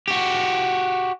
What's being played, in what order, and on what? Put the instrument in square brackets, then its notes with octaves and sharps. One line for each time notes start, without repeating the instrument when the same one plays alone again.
[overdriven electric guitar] F#4 G4